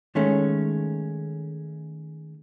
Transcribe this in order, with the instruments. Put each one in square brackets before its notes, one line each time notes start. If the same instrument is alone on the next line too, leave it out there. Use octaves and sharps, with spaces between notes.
[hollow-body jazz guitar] D#3 G#3 A3 C#4